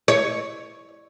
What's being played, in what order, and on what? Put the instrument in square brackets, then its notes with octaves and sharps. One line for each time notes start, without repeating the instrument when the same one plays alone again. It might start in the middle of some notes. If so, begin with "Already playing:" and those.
[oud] C#5